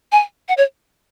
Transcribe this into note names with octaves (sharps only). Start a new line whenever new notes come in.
G#5
F#5
C#5